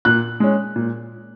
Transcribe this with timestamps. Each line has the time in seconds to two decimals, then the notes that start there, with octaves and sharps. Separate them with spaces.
0.05 A#2 F#6
0.40 G#3 C#4
0.76 A#2